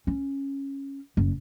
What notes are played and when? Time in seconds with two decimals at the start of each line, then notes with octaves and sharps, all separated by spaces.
0.07 C#4
1.17 F#1